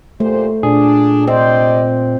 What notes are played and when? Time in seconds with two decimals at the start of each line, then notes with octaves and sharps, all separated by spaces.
0.20 A#2 A3 G4 C5
0.63 A#2 D4 G#4
1.27 C3 C4 C5 D5 D#5